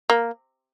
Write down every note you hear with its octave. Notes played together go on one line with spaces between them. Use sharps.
A#3